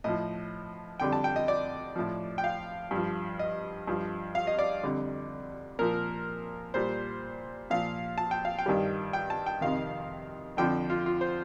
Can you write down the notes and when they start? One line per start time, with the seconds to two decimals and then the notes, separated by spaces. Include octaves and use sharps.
0.04 A2 F3 D#5
1.00 F2 D3 G3 G5
1.13 A5
1.24 G5
1.36 D#5
1.48 D5
1.96 A2 F3
2.38 G5
2.44 F5
2.91 G2 F3
3.39 D#5
3.87 G2 F3
4.35 F5
4.47 D#5
4.59 D5
4.83 F2 D3 G3
5.79 A#2 F3 A#4
6.74 A#2 G3 C5
7.70 A#2 F3 F5
8.18 A5
8.31 G5
8.45 F5
8.59 G5
8.66 G2 D#3 G3
9.13 G5
9.30 A5
9.46 G5
9.61 F2 C3 D#3 F5
10.57 F2 D3 F3 G5
10.90 F4
11.06 F4
11.21 C5